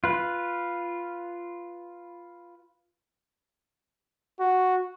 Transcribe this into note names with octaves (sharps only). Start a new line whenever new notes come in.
F4 B4
F#4